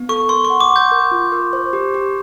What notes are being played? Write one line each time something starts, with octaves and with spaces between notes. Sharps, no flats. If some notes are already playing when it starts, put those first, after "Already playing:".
Already playing: B3
A4 C#6
A#4 C6
C#6
F#5
D6
F#5 G6
A#4
F4
A#4
C5
G4
G4